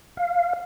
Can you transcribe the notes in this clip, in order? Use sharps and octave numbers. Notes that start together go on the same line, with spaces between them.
F5